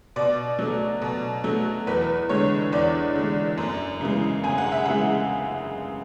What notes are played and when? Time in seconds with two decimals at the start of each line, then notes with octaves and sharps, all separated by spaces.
0.16 B2 D5
0.59 F#3 A3
1.02 B2
1.44 F#3 A3
1.87 E2 B4
2.29 D3 G#3 C#5
2.73 E2 D5
3.15 D3 G#3
3.58 F#2
4.01 C#3 E3 G#3
4.44 F#2 G#5
4.58 F#5
4.72 E5
4.86 C#3 E3 G#3 F#5